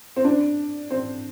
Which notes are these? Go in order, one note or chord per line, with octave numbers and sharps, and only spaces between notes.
C4
D4
C4